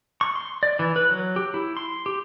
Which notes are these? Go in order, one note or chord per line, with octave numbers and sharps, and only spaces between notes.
C#6
C6
D5
E3
B4
F#3
G4
E4
C6
G4